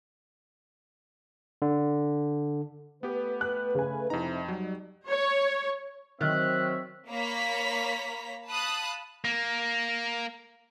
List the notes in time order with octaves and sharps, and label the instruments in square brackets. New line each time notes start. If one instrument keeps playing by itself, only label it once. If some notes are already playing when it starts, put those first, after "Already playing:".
[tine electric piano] D3
[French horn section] A3 B4 [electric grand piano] B3 G4
[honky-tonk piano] F#6
C#3 G#5
[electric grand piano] F2 A#5 [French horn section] C3 E4 [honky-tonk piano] D#4
[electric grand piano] F#3 [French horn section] G3
[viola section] C#5
[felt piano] D#3 [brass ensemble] F#3 C4 C#5 [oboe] E5 [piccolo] F#6
[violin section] A#3 C#5 A#5 B5 B6
F5 A5 B5 D#6 F#6
[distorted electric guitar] A#3